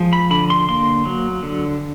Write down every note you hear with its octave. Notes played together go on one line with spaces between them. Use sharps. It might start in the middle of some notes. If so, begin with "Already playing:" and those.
Already playing: F3 G#3
B5
D3 B5
C6
A#3 C6
F#3
D3